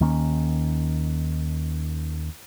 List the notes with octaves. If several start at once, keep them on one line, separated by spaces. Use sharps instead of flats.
D#2 D#3 A#3 C#4